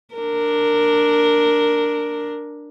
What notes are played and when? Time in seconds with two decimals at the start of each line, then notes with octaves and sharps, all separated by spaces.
0.15 D4 A#4